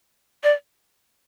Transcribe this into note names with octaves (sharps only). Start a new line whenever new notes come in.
D5